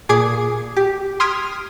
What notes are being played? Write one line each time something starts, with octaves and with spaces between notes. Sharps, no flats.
A#2 G#4 D6 G#6 C7 D7
G4
C6 D#6 F6 G#6 B6 D7